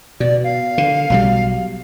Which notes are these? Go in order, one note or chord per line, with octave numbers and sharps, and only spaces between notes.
B2 D5
F5
D3
B1 F#3 G3